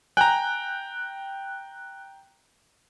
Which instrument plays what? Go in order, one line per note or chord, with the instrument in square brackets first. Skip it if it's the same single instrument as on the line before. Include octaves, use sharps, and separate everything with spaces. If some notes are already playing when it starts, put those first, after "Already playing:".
[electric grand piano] G5 A#5 [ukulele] G#5 [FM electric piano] F#6